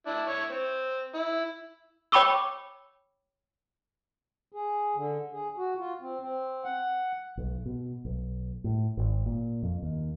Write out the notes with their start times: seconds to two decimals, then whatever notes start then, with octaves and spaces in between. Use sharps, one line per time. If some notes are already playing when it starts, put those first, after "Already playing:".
0.07 D4 E4
0.28 E4 C#5
0.51 C4
1.15 E4
2.12 C#5 G5 B5 C#6 D6 E6
4.52 G#4
4.96 D3
5.32 G#4
5.57 F#4
5.78 F4
6.01 C4
6.20 C4
6.64 F#5
7.37 B1
7.66 B2
8.05 B1
8.64 A2
8.97 G#1
9.26 A#2
9.63 F2
9.82 D#2